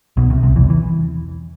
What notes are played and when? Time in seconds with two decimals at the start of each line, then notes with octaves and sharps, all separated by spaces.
0.17 B1 B2
0.30 C2 C3
0.43 C2 C3
0.56 E2 E3
0.70 E3